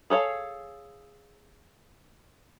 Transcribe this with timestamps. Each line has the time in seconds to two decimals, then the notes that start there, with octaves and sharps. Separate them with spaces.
0.10 G#4 A4 C#5 F5